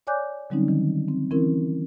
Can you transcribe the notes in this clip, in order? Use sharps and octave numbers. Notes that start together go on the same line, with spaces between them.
C#5 D5 G#5 D6 F#6 G6
D3 F#3 G3 C4 C#4 D#4
D#3
C4
E3 C4 C#4 E4 A#4